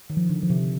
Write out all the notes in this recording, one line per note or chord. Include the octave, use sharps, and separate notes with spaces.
D#3
F3
D3
F3
C3